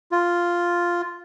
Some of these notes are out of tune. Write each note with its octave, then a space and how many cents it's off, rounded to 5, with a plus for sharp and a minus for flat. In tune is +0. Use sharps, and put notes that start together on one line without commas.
F4 +0